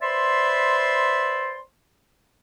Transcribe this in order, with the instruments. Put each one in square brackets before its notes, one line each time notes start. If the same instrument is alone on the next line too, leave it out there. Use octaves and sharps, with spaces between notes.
[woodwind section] B4 C5 D5 E5 B5 C6